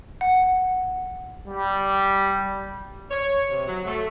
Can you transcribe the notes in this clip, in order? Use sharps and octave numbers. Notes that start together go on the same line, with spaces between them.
F#5
G3
C#5
C3
F#3
A3